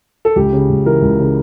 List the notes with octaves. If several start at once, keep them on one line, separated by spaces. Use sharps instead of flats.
A4
C#2 G4
C#3
C#2
E3 A#4
C#2
C#3